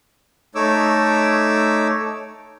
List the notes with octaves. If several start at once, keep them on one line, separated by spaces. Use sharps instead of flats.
A3 D#4 C#5 D6 E6